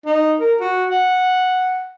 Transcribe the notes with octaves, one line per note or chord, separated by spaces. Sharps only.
D#4
A#4
F#4
F#5